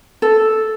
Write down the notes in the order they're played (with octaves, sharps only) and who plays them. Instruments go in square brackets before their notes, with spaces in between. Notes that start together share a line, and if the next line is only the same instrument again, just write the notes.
[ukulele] A4